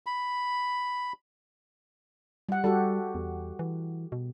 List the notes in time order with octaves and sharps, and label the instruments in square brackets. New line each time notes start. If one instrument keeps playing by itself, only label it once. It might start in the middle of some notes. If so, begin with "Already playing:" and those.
[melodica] B5
[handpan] G3 F#5
[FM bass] G3 [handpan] F#4 G4 A4
[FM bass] E2
E3
B2